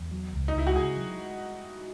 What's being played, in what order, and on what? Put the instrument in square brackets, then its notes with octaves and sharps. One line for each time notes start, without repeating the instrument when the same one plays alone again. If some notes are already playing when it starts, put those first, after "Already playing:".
Already playing: [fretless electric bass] E2
F#3
C#2
[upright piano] D#4
[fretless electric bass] C#2 [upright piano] E4
[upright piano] F#4
[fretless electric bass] C#3 [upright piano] G#4
[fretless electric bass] F#3